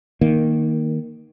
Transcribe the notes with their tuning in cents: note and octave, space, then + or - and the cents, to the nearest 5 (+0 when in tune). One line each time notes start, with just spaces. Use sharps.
D#3 +0 A#3 +0